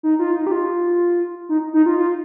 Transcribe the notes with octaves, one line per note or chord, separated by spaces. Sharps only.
D#4
F4
D#4
G4
F4
D#4
D#4
F4
F4